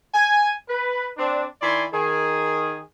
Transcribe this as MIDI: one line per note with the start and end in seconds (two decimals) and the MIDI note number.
0.14 0.51 80
0.68 1.08 71
1.18 1.45 60
1.18 1.45 62
1.61 1.84 51
1.61 1.84 64
1.61 1.84 74
1.61 1.84 80
1.61 1.84 84
1.92 2.79 51
1.92 2.79 68